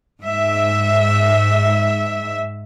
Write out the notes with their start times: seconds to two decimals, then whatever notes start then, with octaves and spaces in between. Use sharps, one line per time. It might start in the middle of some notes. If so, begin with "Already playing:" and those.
0.20 G#2 E5